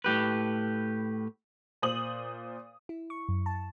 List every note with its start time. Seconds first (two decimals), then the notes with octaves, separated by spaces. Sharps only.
0.04 A2 G4 B4
1.82 A#2 C5 D#6 F#7
2.89 E4
3.10 C#6
3.29 F#2
3.46 A5